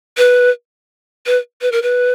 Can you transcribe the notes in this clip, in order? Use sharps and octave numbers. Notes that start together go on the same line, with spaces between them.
B4
B4
B4
A#4
B4